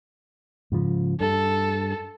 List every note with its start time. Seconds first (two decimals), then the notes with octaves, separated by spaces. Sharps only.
0.72 G#2 C#3 F3
1.20 G2 A4